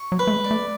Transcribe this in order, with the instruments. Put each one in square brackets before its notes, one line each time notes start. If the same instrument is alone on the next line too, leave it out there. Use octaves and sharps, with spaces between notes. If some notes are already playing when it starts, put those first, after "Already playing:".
Already playing: [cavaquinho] C#6
[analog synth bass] F#3
[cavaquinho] B4
[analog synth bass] A3
G#3
[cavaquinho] D5
[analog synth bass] A3